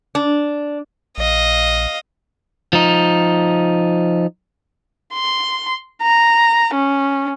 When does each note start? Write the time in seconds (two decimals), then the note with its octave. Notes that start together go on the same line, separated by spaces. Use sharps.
0.15 D4
1.18 A#1 D#5 F5
2.73 F3 D#4
5.14 C6
6.02 A#5
6.74 C#4